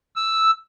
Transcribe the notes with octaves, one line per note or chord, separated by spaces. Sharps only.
E6